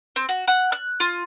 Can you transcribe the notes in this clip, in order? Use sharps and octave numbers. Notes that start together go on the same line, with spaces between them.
C4
F#4
F#5
F#6
F4